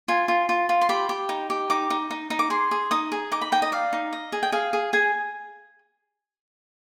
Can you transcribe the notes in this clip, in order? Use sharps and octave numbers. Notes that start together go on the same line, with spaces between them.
F4 G#5
F4
F4
F4
C6
G4 B5
G4
D#4
G4
D#4 D6
D#4
D#4
D#4
D6
G#4 C6
G#4
D#4 D#6
G#4
D#4 D6
B5
D#4 G5
D#5
D5 F5
D#4
D#5
G#4
G5
G#4 F5
G#4
G#4 G#5